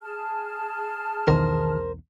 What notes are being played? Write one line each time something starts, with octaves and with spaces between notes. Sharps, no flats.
G#4 A5 F6
B1 E2 D#3 A#4 C5